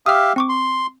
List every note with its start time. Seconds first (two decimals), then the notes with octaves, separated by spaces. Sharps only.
0.06 G4 E5 F5 D#6 F6
0.36 C4 C#6 D6
0.49 C6